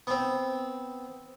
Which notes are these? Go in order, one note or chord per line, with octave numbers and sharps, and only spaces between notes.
B3 C4